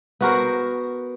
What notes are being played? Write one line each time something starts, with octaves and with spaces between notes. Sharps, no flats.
B3 F#4 A#4 C5